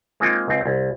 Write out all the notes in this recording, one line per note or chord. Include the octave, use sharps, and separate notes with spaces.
G#3 A#3 C4 D#4 F4 G5
C#2 C4
C2